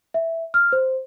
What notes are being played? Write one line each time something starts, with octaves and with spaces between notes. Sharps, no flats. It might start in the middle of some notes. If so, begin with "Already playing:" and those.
E5
F6
C5